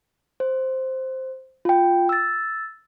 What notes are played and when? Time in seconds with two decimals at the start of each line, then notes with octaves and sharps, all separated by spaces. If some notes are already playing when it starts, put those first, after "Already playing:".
0.40 C5
1.65 F4 G5
2.09 E6 A6